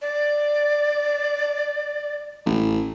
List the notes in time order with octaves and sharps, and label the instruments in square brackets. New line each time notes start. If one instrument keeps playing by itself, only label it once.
[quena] D5
[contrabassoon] A1